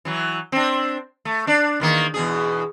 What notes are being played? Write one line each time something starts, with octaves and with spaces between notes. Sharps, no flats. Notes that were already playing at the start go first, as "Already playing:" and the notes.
E3 F#3
C4 D4
A3
D4 D5
E2 D#3 A#3
E2 B2 G#4